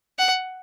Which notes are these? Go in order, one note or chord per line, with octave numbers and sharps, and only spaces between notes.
F#5